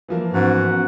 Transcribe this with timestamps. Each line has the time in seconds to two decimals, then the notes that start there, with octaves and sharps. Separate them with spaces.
0.08 E3 F3 A#3
0.34 G#2 B3 C#4 F#4 F#5